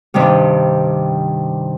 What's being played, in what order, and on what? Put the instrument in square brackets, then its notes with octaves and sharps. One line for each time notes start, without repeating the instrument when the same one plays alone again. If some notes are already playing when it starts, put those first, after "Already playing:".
[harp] G2 C3 D#3 G3